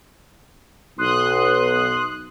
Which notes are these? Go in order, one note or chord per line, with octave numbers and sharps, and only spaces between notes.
B1 C6 D#6 F#6